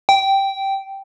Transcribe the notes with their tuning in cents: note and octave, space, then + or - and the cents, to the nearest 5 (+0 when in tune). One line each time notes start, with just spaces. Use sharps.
G5 -10